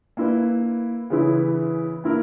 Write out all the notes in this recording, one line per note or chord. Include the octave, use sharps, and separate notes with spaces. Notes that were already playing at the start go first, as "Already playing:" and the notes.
A#3 E4 B4
C#3 E3 B3 E4
A#3 E4 A#4